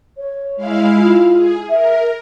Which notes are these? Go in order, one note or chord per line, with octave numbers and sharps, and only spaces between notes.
C#5
G#3 E4 F5
F4
G#4
A#4 E5